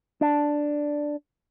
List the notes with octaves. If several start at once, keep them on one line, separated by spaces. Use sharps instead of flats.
D4